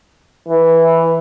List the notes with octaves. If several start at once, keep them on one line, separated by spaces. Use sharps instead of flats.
E3